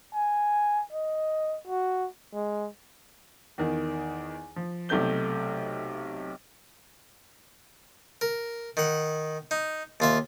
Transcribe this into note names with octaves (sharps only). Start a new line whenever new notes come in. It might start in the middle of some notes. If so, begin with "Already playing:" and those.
G#5
D#5
F#4
G#3
E2 D#3
F3
B1 C3 A3 G6 G7
A#4
D#3 F#5
D#4
D#2 F4 E5